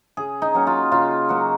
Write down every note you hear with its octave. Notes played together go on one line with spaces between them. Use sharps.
C#3 G#4
D#4
F#3 A#3 C#4
F4
C#3 F4
F#3 A#3 C#4 F#4